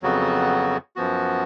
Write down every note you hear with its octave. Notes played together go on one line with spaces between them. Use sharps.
F2 C#3 F#3 B3 F#4
F#2 F3 B3 F#4